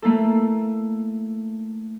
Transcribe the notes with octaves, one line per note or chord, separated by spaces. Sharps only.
A3 A#3 E4 A4